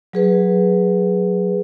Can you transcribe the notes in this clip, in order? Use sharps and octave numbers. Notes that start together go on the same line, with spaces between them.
F#3 G#4 B4